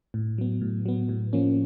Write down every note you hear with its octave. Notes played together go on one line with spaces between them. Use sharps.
A2
F#3 B3
A2
F#3 B3
A2
F3 A#3 C#4